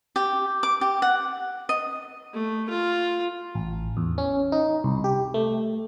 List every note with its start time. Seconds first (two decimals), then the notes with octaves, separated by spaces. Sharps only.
0.16 G4
0.63 D6
0.81 G4
1.02 F#5
1.69 D#5
2.33 A3
2.69 F4
3.55 A1
3.97 E2
4.18 C#4
4.52 D#4
4.84 C2
5.04 G4
5.34 A3